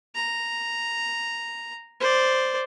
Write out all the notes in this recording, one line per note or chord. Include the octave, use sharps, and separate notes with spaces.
A#5
C5 D5